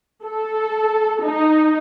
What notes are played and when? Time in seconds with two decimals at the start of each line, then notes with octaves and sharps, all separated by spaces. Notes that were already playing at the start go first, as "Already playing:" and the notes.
0.24 A4
1.22 D#4